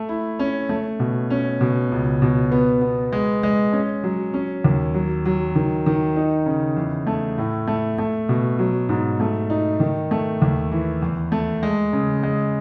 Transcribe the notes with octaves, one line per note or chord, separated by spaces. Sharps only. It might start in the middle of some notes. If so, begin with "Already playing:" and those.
Already playing: A3
E4
C#4
A3
B2
C#4
B2
C#2
B2
B3
B3
G#3
G#3
C#4
F#3
C#4
D#2
F#3
F#3
D#3
D#3
D#4
C#3
E2
A3
A2
A3
A3
B2
F#3
G#2
A3
D#4
D#3
A3
D#2
E3
E2
A3
G#3
C#3
G#3